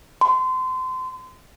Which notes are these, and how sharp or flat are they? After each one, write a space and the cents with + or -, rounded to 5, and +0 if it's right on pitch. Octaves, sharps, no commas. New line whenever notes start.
C6 -30